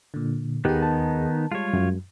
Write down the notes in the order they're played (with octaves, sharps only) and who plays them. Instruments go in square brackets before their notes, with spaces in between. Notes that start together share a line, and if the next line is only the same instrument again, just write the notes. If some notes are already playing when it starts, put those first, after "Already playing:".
[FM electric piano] A#2 D3
[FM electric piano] D#2 G#4 [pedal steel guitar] D#3 B3 D#4 [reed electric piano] G4
[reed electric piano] A5
[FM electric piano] G3 G#3 [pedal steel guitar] F4 C#5
[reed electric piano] F#2